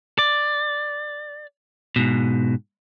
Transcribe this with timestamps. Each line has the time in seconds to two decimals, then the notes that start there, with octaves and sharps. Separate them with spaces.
0.19 D5
1.96 G#2 B2